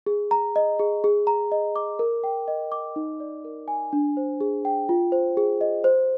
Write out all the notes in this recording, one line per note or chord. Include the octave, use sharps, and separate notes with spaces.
G#4
A#5
D#5
G#4
G#4
A#5
D#5
D6
A#4
G5
D#5
D6
D#4
D5
A#4
G#5
D4
C5
G#4
G5
F4
C5
G#4
D#5
C5